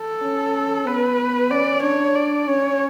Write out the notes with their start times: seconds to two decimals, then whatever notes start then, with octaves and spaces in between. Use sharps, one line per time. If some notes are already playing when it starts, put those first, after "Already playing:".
Already playing: A4
0.22 C#4
0.86 B3 B4
1.51 C#4 D5
1.83 D4 C#5
2.15 D5
2.47 C#4 C#5